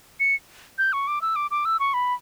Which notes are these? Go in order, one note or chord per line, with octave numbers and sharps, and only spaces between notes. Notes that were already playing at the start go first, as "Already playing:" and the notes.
C#7
G6
C#6
D6
E6
D6
D6
E6
C#6
B5